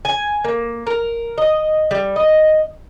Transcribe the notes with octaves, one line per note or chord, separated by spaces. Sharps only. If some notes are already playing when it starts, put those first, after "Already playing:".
G#5
A#3
A#4
D#5
G3
D#5